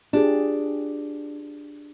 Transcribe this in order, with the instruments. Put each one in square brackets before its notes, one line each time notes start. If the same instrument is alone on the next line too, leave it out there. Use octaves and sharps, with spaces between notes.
[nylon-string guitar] D4 [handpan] F4 G4 G#4